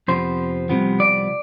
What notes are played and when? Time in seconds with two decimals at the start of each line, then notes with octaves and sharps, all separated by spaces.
0.08 F2 C3 F3 B3 C5
0.69 C2 C3 F3 B3
1.00 D5